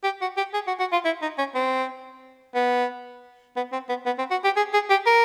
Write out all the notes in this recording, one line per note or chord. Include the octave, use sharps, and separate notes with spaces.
G4
F#4
G4
G#4
F#4
F#4
F4
E4
D#4
C#4
C4
B3
B3
C4
B3
B3
C4
F#4
G4
G#4
G#4
G4
A#4